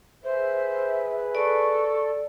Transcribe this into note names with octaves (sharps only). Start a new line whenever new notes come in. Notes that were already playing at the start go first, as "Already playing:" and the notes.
G#4 B4 C5 E5
A4 D5 C#6